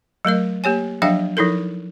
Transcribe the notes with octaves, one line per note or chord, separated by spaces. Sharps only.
F#3 A3 A#4 D#5
A#3 G4 C#5 G#5
F3 F#3 D4 E5 F5 G5
F3 D#4 E4 A4 A#4